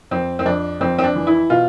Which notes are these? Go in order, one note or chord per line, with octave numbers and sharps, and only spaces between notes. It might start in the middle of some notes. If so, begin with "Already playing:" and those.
F2 C4
C4
F2 D4
F2 C4
C4
D4
E3
E4
B2 F4